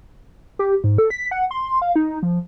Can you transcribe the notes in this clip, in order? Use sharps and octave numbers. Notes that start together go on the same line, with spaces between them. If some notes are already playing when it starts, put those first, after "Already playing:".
G4
G#2
A4
B6
F#5
C6
F5
D#4
F3